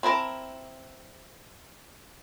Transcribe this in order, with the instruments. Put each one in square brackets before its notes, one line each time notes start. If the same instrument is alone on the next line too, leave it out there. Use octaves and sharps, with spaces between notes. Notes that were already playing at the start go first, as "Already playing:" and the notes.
[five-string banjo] C4 E4 A#4 A5